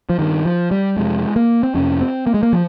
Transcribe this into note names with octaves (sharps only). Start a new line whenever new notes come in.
F3
G2 D#3
F3
G3
F2 C3 G#3
A#3
C4
F2 C3 C#4
C4
A#3
G#3
A#3
F3